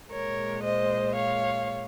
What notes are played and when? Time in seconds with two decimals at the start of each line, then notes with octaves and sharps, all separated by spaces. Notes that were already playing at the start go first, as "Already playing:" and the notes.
0.10 A#2 G#3 A#4 C#5
0.63 C5 D#5
1.15 C#5 F5